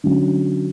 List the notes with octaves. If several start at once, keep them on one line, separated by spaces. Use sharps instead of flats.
D3 F#3 C#4